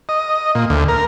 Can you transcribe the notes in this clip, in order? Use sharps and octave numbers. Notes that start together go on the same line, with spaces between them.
D#5
A#2
D2
A#4